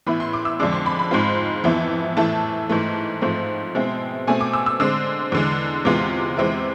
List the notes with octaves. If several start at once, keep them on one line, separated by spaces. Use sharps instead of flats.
A2 E3 B3 E4 B5
C6
D6
E6
F2 D3 G#3 D4 D6
C6
B5
B5
G#2 G#3 C4 F4
F2 E3 B3 E4
A2 E3 A3 E4 A5
G#2 E3 A3
G#2 F3 A3 C4
B2 G#3 C4 E4
B2 A3 C4 G#5
D6
E6
E6
D3 G#3 C4 E6
E2 D3 G#3
E2 C3 G#3 B3 F4 D6
E2 C3 G#3 C4 E4